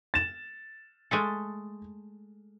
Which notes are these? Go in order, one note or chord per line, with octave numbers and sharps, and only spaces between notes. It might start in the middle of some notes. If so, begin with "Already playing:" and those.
A6 E7
G#3 A3 A4